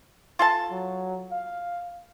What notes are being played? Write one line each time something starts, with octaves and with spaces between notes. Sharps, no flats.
F4 A4 A5
F#3
F5